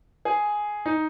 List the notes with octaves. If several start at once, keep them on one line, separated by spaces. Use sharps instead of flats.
G#4
D#4